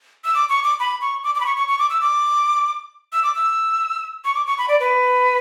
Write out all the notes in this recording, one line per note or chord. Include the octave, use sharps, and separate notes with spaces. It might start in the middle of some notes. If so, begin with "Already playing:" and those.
E6
D6
C#6
D6
B5
C#6
D6
D6
B5
C#6
C#6
C#6
D6
E6
D6
E6
D6
E6
C#6
D6
C#6
B5
D5
B4